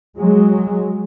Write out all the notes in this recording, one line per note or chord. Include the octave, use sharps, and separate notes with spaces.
F#3 G#3